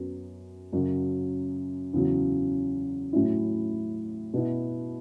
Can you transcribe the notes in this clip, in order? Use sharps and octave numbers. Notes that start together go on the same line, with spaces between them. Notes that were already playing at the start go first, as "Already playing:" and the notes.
Already playing: F#2 F#3 B3
F#2 C#3 F#3
E2 C#3 F#3
A2 F#3 C#4 E4
B2 B3 E4